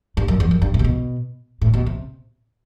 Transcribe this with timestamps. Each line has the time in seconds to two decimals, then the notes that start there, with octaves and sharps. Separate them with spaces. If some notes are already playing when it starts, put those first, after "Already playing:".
0.17 G2
0.28 F#2
0.40 E2
0.51 F#2
0.62 G2
0.74 A2
0.79 C3
0.84 B2
1.61 A2
1.74 B2
1.86 C3